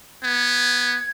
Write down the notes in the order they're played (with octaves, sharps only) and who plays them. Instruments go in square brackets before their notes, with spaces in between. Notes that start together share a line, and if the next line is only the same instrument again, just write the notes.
[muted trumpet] B3 [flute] G#6